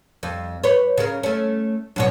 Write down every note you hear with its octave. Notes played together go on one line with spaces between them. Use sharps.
F2
B4 C#5
C#3 A#4
A3 C#4
F#2 B2 C#5